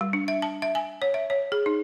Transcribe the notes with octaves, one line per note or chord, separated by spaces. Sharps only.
G3
D4
E5
A5
E5
G#5
C#5
E5
C#5
G#4
D#4